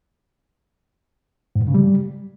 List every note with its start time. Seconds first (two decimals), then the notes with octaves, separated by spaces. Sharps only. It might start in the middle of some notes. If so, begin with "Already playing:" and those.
1.56 G#2
1.62 G2
1.68 C#3
1.74 G3